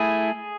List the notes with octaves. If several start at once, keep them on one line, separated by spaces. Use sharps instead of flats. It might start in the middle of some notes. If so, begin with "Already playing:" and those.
Already playing: A3 E4 G#4